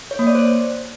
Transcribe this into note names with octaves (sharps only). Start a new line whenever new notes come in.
C#5
A#3
D5
C5